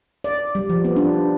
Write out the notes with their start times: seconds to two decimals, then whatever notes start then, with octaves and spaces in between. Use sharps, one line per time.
0.24 D5
0.55 G3
0.69 F3
0.85 B3
0.96 D4